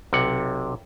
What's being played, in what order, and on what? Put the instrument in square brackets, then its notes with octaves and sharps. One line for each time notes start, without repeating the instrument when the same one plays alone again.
[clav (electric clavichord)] B1 C3 F#5